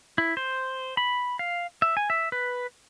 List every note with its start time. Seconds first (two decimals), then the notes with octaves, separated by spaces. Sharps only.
0.18 E4
0.37 C5
0.97 B5
1.39 F5
1.82 E5
1.97 G#5
2.10 E5
2.32 B4